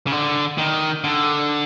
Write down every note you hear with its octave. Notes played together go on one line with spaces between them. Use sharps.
C#3
D3
D#3
D3